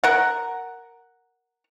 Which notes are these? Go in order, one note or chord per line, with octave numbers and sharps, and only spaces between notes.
A#4 F#5